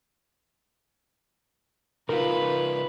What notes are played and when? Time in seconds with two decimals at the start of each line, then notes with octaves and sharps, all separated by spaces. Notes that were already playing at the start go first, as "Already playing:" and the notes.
2.09 C#3 D#4 F4 A#4 B4 B5